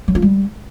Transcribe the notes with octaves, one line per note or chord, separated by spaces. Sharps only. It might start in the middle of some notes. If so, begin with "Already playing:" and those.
F#3
F4
G3